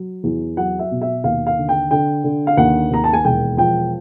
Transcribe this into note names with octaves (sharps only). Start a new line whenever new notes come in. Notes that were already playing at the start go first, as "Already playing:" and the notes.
Already playing: F#3
E2
F#3 F#5
E5
B2
E5
D#2 F5
F5
D3
G5
D3 G5
D3
F5
D#2 F#5
D#2 A#5
A5
G#5
E1 G5
F3 G5